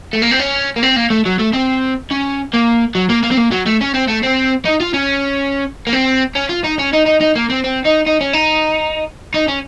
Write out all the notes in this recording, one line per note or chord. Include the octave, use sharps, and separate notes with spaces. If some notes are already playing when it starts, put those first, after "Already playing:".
A3
A#3
C4
C#4
A#3
C4
A#3
A3
F#3
A3
C4
C#4
A#3
F#3
A#3
A#3
C4
A#3
F#3
A3
C#4
C4
A3
C4
D#4
F4
C#4
A#3
C4
C#4
F4
D#4
C#4
D#4
D#4
D#4
A#3
C4
C4
D#4
D#4
C#4
D#4
D#4
C#4